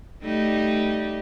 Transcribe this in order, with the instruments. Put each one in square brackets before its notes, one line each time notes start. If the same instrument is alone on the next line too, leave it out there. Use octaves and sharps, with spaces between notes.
[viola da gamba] G3 A3 D#4